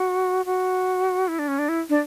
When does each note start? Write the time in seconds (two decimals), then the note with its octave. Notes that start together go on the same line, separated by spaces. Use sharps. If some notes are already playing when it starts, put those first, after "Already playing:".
Already playing: F#4
0.46 F#4
1.28 E4
1.39 D4
1.48 C#4
1.59 D4
1.69 E4
1.89 D4